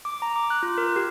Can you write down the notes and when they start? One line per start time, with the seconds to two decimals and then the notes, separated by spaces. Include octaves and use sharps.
0.05 D6
0.22 A#5
0.36 D6
0.50 F#6
0.63 F4
0.78 A#4
0.96 G4